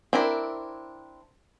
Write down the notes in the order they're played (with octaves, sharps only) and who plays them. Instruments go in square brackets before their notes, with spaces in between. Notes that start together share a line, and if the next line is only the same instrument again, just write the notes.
[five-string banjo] C4 D4 E4 A#4